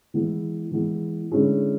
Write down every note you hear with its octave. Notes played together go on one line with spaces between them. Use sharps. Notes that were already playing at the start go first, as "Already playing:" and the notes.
E3 G#3 B3 E4
E3 G#3 B3 E4
D3 G#3 C#4 E4 G#4